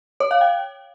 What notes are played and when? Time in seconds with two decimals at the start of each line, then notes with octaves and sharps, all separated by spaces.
0.20 C#5
0.31 F5
0.41 G5